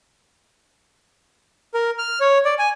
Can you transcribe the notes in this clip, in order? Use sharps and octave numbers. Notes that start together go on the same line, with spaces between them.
A#4
F6
C#5
D5
G#5